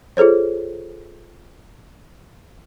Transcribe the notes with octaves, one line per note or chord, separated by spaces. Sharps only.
F4 G#4 A4 C5 C#5